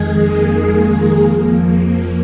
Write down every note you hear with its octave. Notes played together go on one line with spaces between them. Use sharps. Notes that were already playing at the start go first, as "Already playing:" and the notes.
Already playing: F2 D#3 G#3 G#4
A#3
G#3
F2 F3 A#3